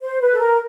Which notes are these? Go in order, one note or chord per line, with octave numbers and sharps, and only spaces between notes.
C5
B4
A4
A#4